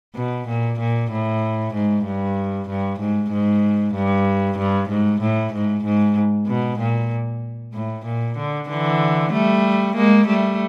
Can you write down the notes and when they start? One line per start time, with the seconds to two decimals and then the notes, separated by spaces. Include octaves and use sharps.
0.15 B2
0.48 A#2
0.80 A#2
1.11 A2
1.74 G#2
2.05 G2
2.69 G2
3.00 G#2
3.32 G#2
3.95 G2
4.58 G2
4.90 G#2
5.21 A2
5.53 G#2
5.85 G#2
6.47 B2
6.79 A#2
7.74 A2
8.06 A#2
8.38 D3
8.69 D3 E3
9.32 G3 A3
9.96 G#3 A#3
10.27 G3 A3